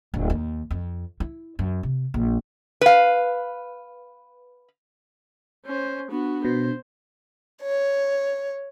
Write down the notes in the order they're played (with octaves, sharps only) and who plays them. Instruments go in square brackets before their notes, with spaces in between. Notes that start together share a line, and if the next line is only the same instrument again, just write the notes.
[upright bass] D1
D#2
F2
E4
F#2
C3
A#1
[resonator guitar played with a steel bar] B4 F5
[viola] C#4 C5
[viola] B3 F#4 [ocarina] D4
[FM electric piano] B2 [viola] C5
[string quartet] C#5